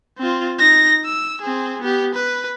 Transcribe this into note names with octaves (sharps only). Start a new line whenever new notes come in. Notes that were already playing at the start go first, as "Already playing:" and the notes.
C4 F4
D#4 A#6
E6
C4 G#4
B3 G4
B4